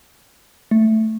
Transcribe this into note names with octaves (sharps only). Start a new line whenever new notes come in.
A3